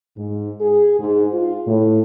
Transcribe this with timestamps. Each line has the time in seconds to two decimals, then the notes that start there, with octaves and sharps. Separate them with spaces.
0.17 G#2
0.61 G#4
1.00 G#2
1.33 F4
1.67 A2